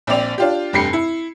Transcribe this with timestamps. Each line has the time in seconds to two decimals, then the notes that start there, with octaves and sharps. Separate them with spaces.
0.07 A#1 C4 D5 F7
0.38 D4 F4 G4
0.73 F1 G2 G4 C7 C#7
0.93 E4